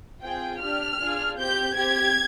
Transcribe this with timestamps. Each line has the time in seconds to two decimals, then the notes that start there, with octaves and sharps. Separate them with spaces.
0.23 C4 F4 G#4 G5
0.61 D4 G4 F6
0.99 D4 F4 G#4
1.37 C4 G4 G6
1.75 C4 G4 G#6